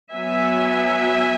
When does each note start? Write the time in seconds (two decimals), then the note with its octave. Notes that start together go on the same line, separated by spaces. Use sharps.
0.13 F#3 B3 E5 G#5